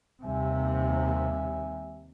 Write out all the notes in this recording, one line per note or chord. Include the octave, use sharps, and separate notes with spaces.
D#2 C3 G3 E5 G#5